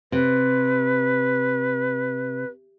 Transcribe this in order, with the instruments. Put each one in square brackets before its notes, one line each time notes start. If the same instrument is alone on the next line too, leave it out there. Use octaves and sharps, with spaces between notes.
[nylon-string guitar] C3 [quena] B4